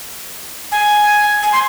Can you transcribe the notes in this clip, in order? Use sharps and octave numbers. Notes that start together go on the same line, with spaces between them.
G#5
G#5
C6